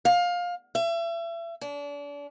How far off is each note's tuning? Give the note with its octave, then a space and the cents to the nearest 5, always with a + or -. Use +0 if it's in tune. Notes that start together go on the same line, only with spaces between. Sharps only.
F5 +20
E5 +35
D4 -35